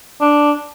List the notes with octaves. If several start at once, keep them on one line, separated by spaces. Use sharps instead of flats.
D4